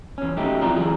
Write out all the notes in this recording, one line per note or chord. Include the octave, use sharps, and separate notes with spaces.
E2 C#4
F#2 B2 A3 D#4 G4
F3 C4 E4 F4 D5 A#5
E3 F#3 G#4